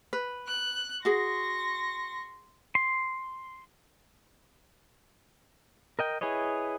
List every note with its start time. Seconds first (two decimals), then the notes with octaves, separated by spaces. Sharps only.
0.13 B4
0.47 F#6
1.05 F#4 G#4 C6 C#6 A#6
2.75 C6
5.99 A#4 D#5 G5
6.21 E4 G#4 B4 C#5 D#5